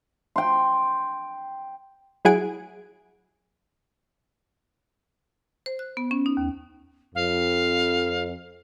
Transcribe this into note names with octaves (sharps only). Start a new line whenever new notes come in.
G5 C6
F#3 E4 G#4 F#5 G#5 D7
C5
F#6
B3
C#4
D#4
D#2
F2 F5